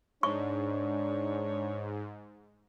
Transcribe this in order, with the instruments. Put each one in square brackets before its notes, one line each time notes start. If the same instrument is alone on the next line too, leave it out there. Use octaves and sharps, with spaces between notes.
[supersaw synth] G#2 [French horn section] D4 [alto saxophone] C#5 [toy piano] C#6